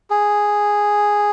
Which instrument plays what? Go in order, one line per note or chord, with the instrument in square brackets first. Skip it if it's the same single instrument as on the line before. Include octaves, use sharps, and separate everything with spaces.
[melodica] G#4